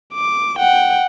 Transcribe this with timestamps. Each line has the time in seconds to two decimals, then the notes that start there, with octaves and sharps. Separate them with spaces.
0.14 D6
0.59 F#5 G5